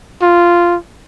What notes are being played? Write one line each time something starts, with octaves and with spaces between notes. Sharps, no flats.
F4